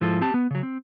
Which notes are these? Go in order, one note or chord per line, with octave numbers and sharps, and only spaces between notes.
G#2 F3 E4 F4 A4
C4 G4 A5
B3
C#3 F#3
C4